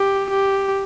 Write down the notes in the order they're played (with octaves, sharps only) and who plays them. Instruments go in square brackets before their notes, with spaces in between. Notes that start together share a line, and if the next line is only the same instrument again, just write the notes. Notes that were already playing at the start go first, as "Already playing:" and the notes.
Already playing: [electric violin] G4
G4